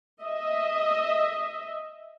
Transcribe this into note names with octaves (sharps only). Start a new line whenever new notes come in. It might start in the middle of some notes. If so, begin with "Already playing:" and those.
D#5 E5